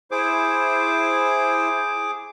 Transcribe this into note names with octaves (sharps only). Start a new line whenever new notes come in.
E4 G#4 C5 D6